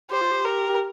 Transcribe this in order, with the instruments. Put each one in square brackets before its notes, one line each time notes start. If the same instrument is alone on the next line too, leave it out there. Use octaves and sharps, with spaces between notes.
[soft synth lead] G4 [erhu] C5
[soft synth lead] F4
G4
[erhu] A#4
[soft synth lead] G4